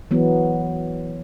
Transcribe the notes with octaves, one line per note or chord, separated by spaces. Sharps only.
E3 F#3 B3